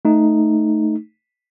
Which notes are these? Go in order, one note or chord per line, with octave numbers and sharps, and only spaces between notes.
A3 D#4